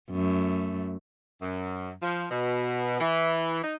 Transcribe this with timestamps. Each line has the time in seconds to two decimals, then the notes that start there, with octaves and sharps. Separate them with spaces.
0.11 F#2 A3
1.42 F#2
2.02 F3
2.31 B2
3.00 E3
3.64 D#4